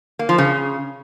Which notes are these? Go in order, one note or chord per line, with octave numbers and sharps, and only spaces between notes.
A#3
F3
C#3